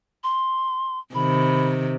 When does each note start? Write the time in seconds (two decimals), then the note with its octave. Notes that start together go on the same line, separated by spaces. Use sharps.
0.24 C6
1.15 C3 D#3 B5